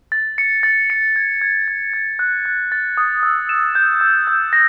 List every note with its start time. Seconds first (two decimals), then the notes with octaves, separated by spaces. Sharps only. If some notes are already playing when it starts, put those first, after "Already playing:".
0.12 A6
0.38 C#7
0.63 A6
0.90 C#7
1.16 G#6
1.41 G#6
1.68 G#6
1.93 G#6
2.19 F#6
2.45 F#6
2.72 A6
2.97 D#6
3.23 E6
3.49 E7
3.75 G6
4.01 E6
4.27 G6
4.53 A#6